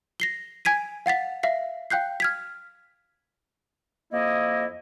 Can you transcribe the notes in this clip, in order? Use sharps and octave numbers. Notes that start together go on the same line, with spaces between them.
A#6 C7 G7
G#5 G#6 B6 D#7
F5 F#5 A6 B6
E5 F5 C7
F5 G5 F#6 G6 C7
F6 G#6 B6
F2 A#3 E4 D#5